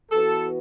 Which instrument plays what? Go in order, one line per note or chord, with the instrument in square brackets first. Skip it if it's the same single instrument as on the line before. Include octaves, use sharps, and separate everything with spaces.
[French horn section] E3 B3 F#4 B4 [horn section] A4